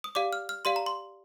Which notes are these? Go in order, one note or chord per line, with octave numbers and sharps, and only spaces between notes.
D#6
G4 D5 F5 D6
F6
F6
G4 D5 F5 C6
A#5
C6